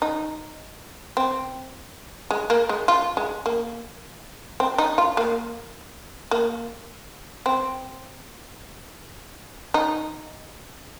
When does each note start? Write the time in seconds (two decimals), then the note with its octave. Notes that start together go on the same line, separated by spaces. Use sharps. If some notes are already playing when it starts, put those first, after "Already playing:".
0.02 D#4
1.17 C4
2.31 G#3
2.50 A#3
2.69 G#3
2.88 F4
3.17 G#3
3.46 A#3
4.60 C4
4.78 D#4
4.98 F4
5.17 A#3
6.31 A#3
7.46 C4
9.74 D#4